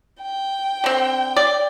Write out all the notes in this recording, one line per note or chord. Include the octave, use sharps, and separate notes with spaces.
G5
D3 C4
D5